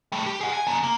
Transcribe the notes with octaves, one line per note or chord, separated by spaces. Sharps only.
G3 A3
G4
G#4 F#5
G#5
C#3 A#3
A#3